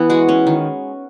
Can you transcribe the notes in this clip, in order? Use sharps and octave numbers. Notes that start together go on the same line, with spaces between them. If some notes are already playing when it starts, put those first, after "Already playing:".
Already playing: E3 B3 E4
G#3 F#4
C#4
D#3